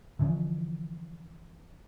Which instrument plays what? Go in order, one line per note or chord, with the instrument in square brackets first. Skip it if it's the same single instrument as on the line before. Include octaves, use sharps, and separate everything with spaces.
[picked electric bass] D3 E3 F3 C#4